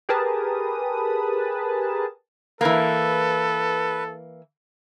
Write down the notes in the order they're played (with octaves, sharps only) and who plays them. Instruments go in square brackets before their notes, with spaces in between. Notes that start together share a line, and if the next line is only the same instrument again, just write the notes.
[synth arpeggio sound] G4 G#4 A#4 B4 A5 D#6
[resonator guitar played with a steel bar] E3 A#3 [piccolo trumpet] A4 [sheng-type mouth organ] B4